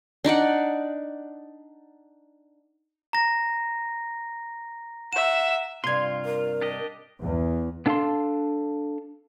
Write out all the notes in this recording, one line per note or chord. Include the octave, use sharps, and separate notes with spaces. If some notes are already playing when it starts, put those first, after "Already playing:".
D4 D#4 D5 F#5
A#5 A#6
E5 F#5 E7
G2 C3 F4 C6 G#6
A#4
D4 G4 D#5
E2
B3 D4 A4 F5 A5 C6